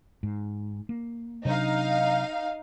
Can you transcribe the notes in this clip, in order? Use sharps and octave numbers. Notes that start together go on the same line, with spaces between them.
G#2
A#3
C3 F#3 D4 D#4 F5